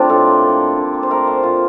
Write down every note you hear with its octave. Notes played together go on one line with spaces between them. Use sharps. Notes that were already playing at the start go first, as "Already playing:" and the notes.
Already playing: G3 A3 C4 D4 F4
A2 A4
A#3
D3
G3
D3
A#3
C5
A3 A#4
A3 C5
A#2 F4